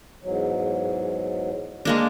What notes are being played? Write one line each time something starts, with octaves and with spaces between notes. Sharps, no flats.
E2 G#2 F#3
G#3 A#3 D4